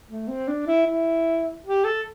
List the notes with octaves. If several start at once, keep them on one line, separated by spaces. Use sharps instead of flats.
A3
C4
D4
E4
E4
G4
A4